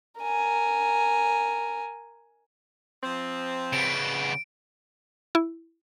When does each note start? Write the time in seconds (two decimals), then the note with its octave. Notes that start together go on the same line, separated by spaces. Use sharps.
0.21 A#4 G#5
3.03 F3 C4
3.73 C#3 B3 D7
5.35 E4